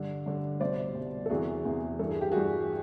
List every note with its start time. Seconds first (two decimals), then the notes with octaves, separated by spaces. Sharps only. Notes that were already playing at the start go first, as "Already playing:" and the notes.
Already playing: G2 D3
0.26 G2 D3
0.60 C2 B2 C5 D5
0.95 C2 B2
1.26 A4
1.29 E2 C3 E3 F#4 G#4
1.65 E2 C3 E3
1.99 G2 E3 A4
2.10 G#4
2.21 G4
2.32 G2 E3 F#4 G#4